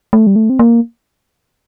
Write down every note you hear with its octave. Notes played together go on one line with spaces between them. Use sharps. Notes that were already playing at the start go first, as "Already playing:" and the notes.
A3
G3
A3
C4
A#3